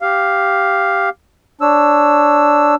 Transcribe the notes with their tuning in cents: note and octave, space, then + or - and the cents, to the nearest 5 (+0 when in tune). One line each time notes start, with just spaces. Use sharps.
G4 +0 F5 +0
D4 +0 C#5 -10 E6 +5